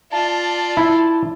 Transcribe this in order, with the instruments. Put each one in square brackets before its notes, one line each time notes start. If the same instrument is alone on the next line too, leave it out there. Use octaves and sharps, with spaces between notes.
[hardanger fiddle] F4 D5 [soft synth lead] A5
[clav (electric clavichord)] E4